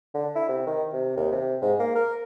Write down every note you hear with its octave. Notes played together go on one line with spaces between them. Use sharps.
D3
E4
C3
D#3
C3
D#2
C3
G#2
A#3
A#4